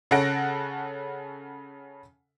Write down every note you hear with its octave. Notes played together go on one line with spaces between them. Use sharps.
C#3 C#4 A4 F#5 A#6 D7